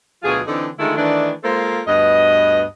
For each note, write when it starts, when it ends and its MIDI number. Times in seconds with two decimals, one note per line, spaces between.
0.23 0.40 38
0.23 0.40 47
0.23 0.40 54
0.23 0.40 65
0.23 0.40 68
0.47 0.68 50
0.47 0.68 52
0.47 0.68 60
0.47 0.68 63
0.47 0.68 69
0.78 0.95 50
0.78 0.95 51
0.78 0.95 56
0.78 0.95 57
0.78 0.95 64
0.78 0.95 65
0.96 1.31 51
0.96 1.31 52
0.96 1.31 57
0.96 1.31 62
1.44 1.81 56
1.44 1.81 58
1.44 1.81 65
1.44 1.81 69
1.44 1.81 72
1.87 2.63 38
1.87 2.63 43
1.87 2.63 59
1.87 2.63 75